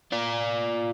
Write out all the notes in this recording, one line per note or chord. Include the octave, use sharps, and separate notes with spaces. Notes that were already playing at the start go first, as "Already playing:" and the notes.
F4 D5